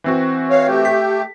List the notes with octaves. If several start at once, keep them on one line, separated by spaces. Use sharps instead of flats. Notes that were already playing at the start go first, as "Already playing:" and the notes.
E3 C4 F#4
C#5 F5
A3 G4
B6